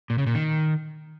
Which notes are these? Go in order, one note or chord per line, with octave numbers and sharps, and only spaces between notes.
A#2
C#3
A#2
D#3